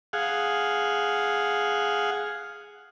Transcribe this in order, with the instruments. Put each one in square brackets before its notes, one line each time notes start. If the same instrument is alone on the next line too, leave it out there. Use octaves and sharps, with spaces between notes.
[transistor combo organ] G#4 F5 F#5